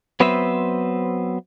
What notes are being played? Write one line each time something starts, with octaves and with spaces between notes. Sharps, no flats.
F#3 B3 C4 B4 C5 E5